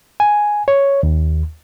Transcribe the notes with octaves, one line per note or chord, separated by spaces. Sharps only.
G#5
C#5
D#2